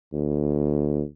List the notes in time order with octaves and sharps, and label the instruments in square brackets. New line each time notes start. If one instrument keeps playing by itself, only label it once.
[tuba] D2